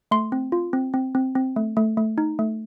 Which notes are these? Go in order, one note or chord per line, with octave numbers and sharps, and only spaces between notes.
A3 C6
C4
F4
C4
C4
C4
C4
A3
A3
A3
D#4
A3